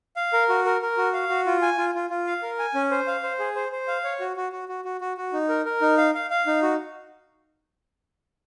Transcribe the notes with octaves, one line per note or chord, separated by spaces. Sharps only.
F5
A#4
F#4
A#4
A#4
F#4
F5
F#4
F4
G#5
F4
F4
F4
F5
A#4
G#5
C#4
C5
F5
C5
G#4
C5
C5
F5
C#5
F#4
F#4
F#4
F#4
F#4
F#4
F#4
D#4
A#4
A#4
D#4
F5
F5
F5
D#4
F#4